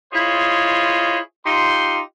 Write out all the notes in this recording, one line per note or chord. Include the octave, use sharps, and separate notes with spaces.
E4 F4 G#4 C5 C#5 D#5
D#4 F4 G4 C6